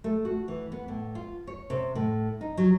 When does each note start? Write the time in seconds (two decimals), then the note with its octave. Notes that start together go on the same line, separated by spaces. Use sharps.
0.04 A3
0.25 F#4
0.48 E3
0.72 B3
0.88 A2
1.15 F4
1.47 C#5
1.70 C3
1.95 A2
2.41 D#4
2.57 F#3